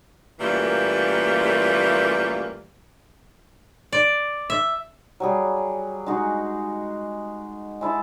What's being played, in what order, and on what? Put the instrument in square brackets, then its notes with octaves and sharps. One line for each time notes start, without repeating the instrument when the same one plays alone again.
[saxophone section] F#2 A#2 E3 G3 A3 A#3
[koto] D5
E5
[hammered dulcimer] F#3 G3 G#4
G#3 D#4 F#4 G#4
G#3 E4 A5